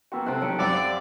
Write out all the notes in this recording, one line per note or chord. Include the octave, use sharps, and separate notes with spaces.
A#3 B3 F#4 G5 C6 E6
C3 C4 A4 A5 F#6
D#3 F#3 C#4 G5 C#7 D7
F#2 G3 C4 D5 F5 C6 E6